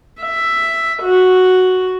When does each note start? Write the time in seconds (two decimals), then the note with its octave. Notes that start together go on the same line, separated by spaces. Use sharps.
0.22 E5
1.03 F#4